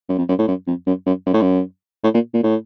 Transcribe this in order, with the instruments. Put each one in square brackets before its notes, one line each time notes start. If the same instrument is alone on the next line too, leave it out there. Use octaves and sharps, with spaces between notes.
[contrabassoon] F#2
F2
F#2
A2
F#2
F2
F#2
F#2
F#2
A2
F#2
A2
A#2
A#2
A2